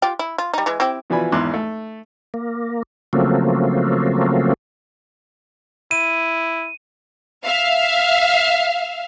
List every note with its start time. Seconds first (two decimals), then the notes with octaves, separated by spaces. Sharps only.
0.02 F4 G4
0.19 E4
0.38 F4
0.54 G3 D#4
0.66 E3 G#3
0.80 C4 E4 G4
1.10 B2 E3 F3 D5 G#5 B5
1.32 G#1 E2 C6 D6 F#6
1.54 A3
2.34 A#3
3.13 C#3 F3 F#3 A3 A#3 C4
5.91 E4 D#7
7.44 E5 F5